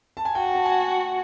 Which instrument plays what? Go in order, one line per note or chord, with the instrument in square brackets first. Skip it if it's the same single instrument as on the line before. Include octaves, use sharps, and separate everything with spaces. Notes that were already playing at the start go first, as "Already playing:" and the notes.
[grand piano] A5
G#5
[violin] F#4 [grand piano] G5
[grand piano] A5
G#5